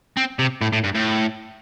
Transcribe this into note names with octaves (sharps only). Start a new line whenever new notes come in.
C4
C3
A2
A2
G2
A2